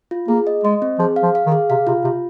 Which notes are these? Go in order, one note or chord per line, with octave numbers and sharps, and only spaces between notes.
F4
A#3 G#4
D#5
G#3 D#5
C4
F3 G#4
F5
F3
F5
D#3
G#4
C3 F5
C3 F4
C3 F4